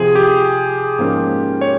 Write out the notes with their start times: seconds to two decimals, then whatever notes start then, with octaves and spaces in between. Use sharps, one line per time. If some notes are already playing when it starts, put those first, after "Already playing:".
Already playing: C3 F3 C4 G#4
0.15 G4
0.99 G#2 F3 A#3 C#4
1.61 C#5